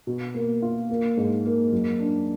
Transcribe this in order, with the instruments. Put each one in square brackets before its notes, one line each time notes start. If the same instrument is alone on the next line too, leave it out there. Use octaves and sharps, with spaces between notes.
[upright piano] B2
A#3
F4
A#3
G#2
A#3
F#2
D4